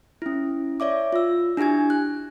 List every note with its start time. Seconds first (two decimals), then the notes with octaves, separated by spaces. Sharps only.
0.22 C#4 E4
0.80 C#5 D5 E5 D6
1.13 F4 E6
1.57 D4 E4 G4 G#5 G#6
1.90 F#6